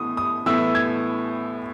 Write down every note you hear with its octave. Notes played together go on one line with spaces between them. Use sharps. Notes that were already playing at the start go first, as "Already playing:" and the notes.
Already playing: A2 E3 B3 D#6
D#6
A2 E3 B3 E4 E6
G#6